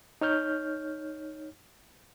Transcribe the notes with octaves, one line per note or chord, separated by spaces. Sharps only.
D#4 C#5 F6 G6